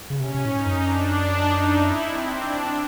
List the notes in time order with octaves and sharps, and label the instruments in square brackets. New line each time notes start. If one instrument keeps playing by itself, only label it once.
[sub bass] C#3
[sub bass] C3 [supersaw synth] C#4
[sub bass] C3
A2
[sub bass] G#2 [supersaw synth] D#4
[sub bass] F#2
[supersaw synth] D4
D#4
E4
C4
D4